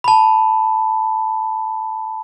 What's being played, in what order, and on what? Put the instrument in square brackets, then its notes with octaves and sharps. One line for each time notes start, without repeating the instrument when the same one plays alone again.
[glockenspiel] A5 B5